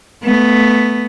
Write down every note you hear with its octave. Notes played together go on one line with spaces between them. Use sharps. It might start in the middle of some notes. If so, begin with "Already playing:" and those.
A3 B3